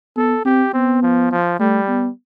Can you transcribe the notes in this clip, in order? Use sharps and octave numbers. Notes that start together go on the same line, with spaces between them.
B3 A4
C4 G4
B3 C4
F3
F3
G3 A3
B3